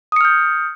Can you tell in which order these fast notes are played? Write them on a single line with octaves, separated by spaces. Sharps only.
D#6 C#7 F6 G6